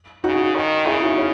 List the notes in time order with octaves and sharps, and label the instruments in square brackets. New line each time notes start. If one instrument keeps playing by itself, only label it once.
[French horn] C#3 [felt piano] D#4 F#4
[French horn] D#3
[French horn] C#3 [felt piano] E4 G#4
[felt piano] D#4 F#4
C#4 E4